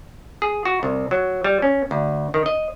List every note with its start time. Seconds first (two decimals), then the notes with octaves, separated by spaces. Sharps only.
0.42 G#4
0.65 F#4
0.83 C2
1.11 F#3
1.44 G3
1.62 C#4
1.91 D2
2.34 D#3
2.46 D#5